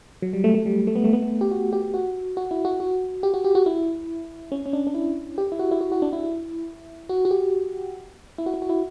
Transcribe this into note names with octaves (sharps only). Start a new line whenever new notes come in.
F#3
G3
A3
A3
G3
A3
B3
A3
B3
A3
G4
F#4
G4
F#4
F#4
E4
F#4
F#4
G4
F#4
G4
F#4
E4
C#4
C#4
D4
D4
E4
G4
E4
F#4
E4
F#4
F#4
D4
E4
F#4
F#4
G4
E4
F#4
E4
F#4
E4